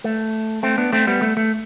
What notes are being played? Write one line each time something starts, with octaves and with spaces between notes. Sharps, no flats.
A3
A3 C4
B3 D4
A3 C4
G3 B3
A3
A3